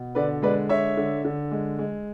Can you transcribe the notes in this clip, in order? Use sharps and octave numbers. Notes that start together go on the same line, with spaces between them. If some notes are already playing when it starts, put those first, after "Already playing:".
Already playing: B2
D3 B4 D5
G#3 B4 D5
D3 C#5 E5
D3
D3
G#3
G#3